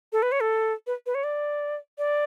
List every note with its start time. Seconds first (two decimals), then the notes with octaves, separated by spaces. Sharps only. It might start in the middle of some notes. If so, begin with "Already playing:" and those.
0.13 A4
0.22 B4
0.32 C#5
0.41 A4
0.87 B4
1.06 B4
1.15 C#5
1.24 D5
1.98 D5